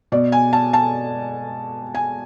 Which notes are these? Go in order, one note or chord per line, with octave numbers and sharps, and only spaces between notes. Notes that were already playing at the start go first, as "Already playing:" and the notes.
B2 D5
G#5
A5
A5
G#5